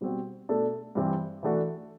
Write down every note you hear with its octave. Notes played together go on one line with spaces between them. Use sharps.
B2 G3 C4 F#4
B2 A3 D4 A4
G2 E3 G3 C4
E3 A3 D4 F#4